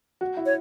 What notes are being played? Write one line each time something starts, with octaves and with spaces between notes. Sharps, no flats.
F#4
E4
C#5